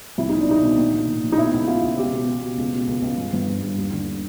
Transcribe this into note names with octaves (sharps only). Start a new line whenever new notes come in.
C2 E4
B2 D#4
D4
B2 D#4
B2
A#2
A#2
A#2
A#1
D#4
B2 E4
C#2
B2 F4
C#2
B2 G4
B2
B2
B2
C#2
B2
C#2
C#2
G1
G1
G2
G2
D#2
D3